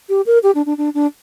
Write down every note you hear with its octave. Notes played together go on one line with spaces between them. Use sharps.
G4
A#4
G4
D4
D4
D4
D4